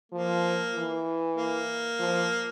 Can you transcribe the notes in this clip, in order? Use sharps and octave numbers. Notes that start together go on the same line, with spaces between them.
F3 A#3
E3
A#3
F3